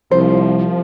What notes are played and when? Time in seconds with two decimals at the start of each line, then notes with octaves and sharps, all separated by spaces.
0.11 C2 F3 C5